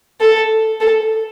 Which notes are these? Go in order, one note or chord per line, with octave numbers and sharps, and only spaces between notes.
A4
A4